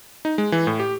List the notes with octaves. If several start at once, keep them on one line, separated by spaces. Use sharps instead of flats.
D#4
G#3
E3
A2
G4